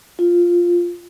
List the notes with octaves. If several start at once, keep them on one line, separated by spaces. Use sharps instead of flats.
F4